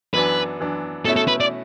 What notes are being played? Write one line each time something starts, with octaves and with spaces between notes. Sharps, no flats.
F#2 E3 B3 D4 B4
F#2 E3 B3 D4
B2 A3 C#4 E4 A4
A4
B4
D5